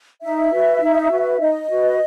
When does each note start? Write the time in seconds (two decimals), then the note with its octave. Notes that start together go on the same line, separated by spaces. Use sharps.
0.22 D#4 E5
0.52 F#4 B4
0.81 D#4
1.11 F#4 B4
1.40 D#4 D#5
1.69 F#4 B4